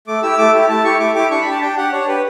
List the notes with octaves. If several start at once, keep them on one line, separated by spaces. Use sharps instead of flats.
A3 D6
E4 G4 E6
A3 D6
E4 G4
A3 A5
E4 G4 C#6
A3 D6
E4 G4 D6
D4 C#6
B5
G4
A5
D4 G5
G4 F#5
D4 C#5
G4 B4